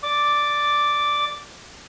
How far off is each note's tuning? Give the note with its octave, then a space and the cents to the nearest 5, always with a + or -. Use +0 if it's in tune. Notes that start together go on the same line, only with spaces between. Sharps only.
D5 +0 D6 +0